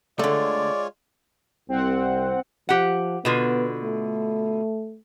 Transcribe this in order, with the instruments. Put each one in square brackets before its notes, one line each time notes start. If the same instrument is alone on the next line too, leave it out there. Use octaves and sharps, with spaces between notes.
[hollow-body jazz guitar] D3 A3 [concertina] G#3 F4 C#5 [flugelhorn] D5
[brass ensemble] C2 [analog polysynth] C4 F#5
[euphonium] F3 [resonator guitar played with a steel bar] G4 F#5
[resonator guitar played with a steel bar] B2 D3 F4 [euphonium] B3
[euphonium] A3